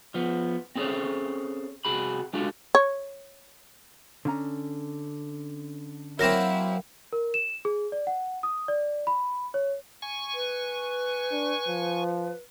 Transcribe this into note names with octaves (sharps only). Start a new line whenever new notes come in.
F3 B3
C4 C#4 G#4 A4 C5 C#5
C3 F#4 G#4 B5
G#3 D4 F4 F#4 A4
C#5
D3 C#4 A#5
F#3 A#3 C4 E4 A#4 A#6 E7
A#4
E7
G#4
D5
F#5
D#6
D5
B5
C#5
G#5 C#6
B4
D4
F3